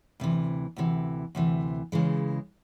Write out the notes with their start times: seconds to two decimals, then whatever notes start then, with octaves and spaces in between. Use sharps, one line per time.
0.20 D2 C3 E3
0.76 D2 C3 E3
1.35 D2 C3 E3
1.92 C#3 E3 G#3